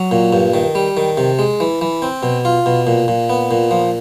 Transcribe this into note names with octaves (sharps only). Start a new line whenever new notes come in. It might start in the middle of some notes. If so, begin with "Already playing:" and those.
Already playing: F#3
A#2
G2
D#3
G3
D#3
C3
G#3
E3
E3
C4
B2
F4
B2
A#2
A#2
B3
A#2
F3